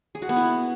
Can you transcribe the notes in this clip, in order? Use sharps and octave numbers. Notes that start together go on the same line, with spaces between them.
G#4
F#4
B3
E4